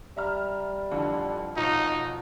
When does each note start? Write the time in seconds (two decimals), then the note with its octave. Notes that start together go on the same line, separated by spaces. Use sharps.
0.17 G3 E5 A#5 F6
0.91 F2 D3 E3
1.57 B2 C#4 D#4 F4